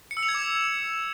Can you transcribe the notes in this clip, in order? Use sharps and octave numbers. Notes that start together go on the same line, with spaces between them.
C#7
E6
F7
G#6
D6